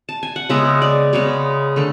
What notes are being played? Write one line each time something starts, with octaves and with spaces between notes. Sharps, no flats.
A5
G#5
F#5
C#3 G#3 B3 E5
D5
C#3 G#3 B3 C#5
D3 A3